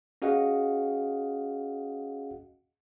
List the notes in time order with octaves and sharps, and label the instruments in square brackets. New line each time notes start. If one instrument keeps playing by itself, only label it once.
[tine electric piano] C#4 F#4 G#4 D#5 F5 F#5